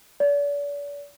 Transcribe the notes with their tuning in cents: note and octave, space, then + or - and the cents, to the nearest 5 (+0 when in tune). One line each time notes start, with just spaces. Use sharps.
D5 -40